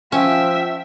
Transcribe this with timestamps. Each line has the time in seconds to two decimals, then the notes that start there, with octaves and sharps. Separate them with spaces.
0.12 F3 C#4 E5 G5